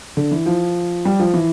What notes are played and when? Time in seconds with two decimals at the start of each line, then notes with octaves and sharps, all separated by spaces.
0.17 D3
0.31 E3
0.46 F3
1.05 G3
1.20 F3
1.34 E3